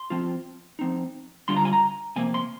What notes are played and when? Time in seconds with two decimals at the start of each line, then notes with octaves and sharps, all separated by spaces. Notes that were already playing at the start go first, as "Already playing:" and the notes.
Already playing: C6
0.10 F3 C4 F4
0.79 F3 C4 D#4
1.48 D3 G3 D4 F4 C6
1.57 A#5
1.65 G#5
1.73 A#5
2.16 C3 F3 A#3 G#5
2.34 C6